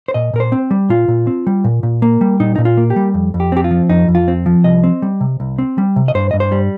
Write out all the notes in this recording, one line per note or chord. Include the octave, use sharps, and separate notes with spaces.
C5
A#2 D#5
A#2 A#4
C5
C4
G3
A#2 F4
A#2
C4
G3
A#2
A#2
A#3
G3
A#2 D#4
A#2 D#4
F4
A#3
G4
G3
F2
F2
G4
C4 G4
F4
F3
F2 D#4
F2
F4
C4
F3
C2 D#5
C4
G3
C3
C2
C4
G3
C3
D#5
G2 C5
G2 D#5
C5
G3